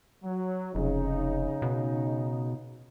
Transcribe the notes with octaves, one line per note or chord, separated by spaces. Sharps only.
F#3
F1 C#3 D#4
B2